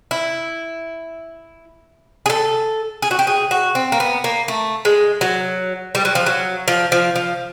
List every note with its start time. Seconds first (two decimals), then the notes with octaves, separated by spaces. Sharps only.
0.11 E4
2.26 G#4
2.30 A4
3.02 G#4
3.11 F#4
3.19 G4
3.27 G#4
3.51 F#4
3.75 C4
3.92 A#3
4.00 B3
4.24 A#3
4.48 A3
4.85 G#3
5.21 F#3
5.95 G3
6.05 F#3
6.15 F3
6.26 F#3
6.68 F3
6.92 F3
7.16 F3